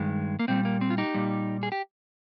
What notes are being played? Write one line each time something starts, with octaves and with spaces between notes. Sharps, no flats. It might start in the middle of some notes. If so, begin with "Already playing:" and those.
Already playing: G2 D#3 G#3
A#3
A#2 G3 C4
A#3
C4
F4
D#4 G4
A#2 G3
G#4
G4